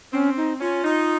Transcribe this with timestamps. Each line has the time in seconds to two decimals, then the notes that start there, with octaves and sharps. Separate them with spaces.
0.13 C4 C#4
0.37 D#4
0.61 C#4 F4
0.85 D#4